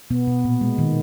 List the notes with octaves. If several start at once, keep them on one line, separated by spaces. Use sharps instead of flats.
B2 B3
B2
A#2
G#3
D#3